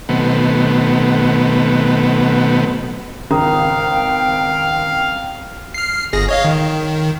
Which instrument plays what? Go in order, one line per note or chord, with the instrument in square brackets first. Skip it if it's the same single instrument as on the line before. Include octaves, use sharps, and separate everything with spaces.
[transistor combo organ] B2 D#3 F#3 A3 B3 C4
[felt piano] G#1 C#2 [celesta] A#4 A#5 D#6 [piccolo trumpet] F5 [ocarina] G5
[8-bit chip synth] F6 C7
G1 G#4 A#6
C#5 D#5 F5
D#3